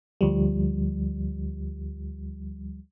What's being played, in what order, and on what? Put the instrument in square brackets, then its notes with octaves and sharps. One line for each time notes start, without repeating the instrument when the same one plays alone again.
[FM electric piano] D2 F3 G3